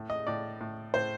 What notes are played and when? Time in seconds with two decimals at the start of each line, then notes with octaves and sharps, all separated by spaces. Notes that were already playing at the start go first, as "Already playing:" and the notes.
Already playing: A2
0.10 D#5
0.27 A2 D5
0.61 A2
0.94 A2 C5